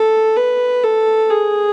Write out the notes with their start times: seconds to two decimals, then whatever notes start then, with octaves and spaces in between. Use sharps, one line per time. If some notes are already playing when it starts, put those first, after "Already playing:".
Already playing: A4
0.37 B4
0.83 A4
1.30 G#4